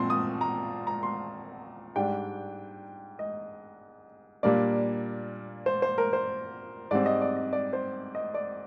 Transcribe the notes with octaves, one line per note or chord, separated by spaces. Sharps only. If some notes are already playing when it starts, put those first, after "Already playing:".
Already playing: A#2 F3 C4 C6
D#6
A#5
A#5
C6
G#2 G3 D4 G5
D#5
A#2 G3 A#3 D4 D5
C5
C5
A#4
C5
G#2 G3 C4 D5
D#5
D5
D#5
D5
C5
D#5
D5